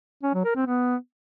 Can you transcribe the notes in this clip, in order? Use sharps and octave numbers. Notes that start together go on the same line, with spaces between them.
C#4
F#3
A#4
C4
B3